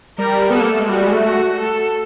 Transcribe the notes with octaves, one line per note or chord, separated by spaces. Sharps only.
G3 A#4
B3 A4
A#3
A3
G#3
G3 F#4
G#3
A3
F#4
A4